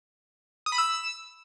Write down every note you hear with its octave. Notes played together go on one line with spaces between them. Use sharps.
D#6
B5
E6